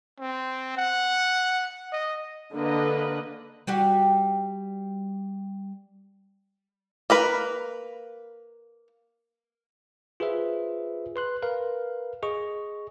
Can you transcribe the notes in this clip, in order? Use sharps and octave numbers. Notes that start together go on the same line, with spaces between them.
C4
F#5
D#5
D3 A#3 B4 D#5
G3 F#4 G4
A#3 A#4 B4
F4 G#4 B4 C5 E5
B4 C6 F#6
A#4 B4 F5
G#4 D#5 C#6